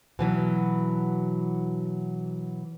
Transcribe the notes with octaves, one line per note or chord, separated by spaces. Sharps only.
B2 E3 F#3